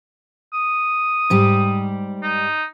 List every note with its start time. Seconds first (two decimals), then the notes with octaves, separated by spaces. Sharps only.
0.53 D#6
1.30 G#2 G3 G4
2.23 D#4